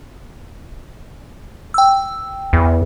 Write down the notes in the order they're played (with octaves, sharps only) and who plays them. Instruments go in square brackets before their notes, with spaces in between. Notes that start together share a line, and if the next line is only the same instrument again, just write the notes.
[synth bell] G5 E6
[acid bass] E2